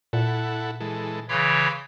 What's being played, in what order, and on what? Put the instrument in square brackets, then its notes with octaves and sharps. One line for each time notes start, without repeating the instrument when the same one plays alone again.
[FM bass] A#2 [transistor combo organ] E4 A4 F#5
[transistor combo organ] E3 G#3 A4
[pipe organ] C#3 E3 C#5 [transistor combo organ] B5 C6 D6